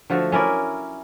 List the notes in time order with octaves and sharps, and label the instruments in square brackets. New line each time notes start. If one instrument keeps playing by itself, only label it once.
[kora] D3 F3 A3 F#4
C#4 E4 A#4 D5